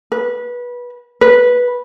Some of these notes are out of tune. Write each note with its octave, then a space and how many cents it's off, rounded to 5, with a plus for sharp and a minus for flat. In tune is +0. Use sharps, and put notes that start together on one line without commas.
B4 -20
B4 -10